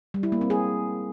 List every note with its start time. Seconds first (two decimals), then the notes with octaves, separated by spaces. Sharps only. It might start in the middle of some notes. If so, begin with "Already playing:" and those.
0.14 G3
0.23 E4
0.32 A#3
0.41 C4
0.50 G#4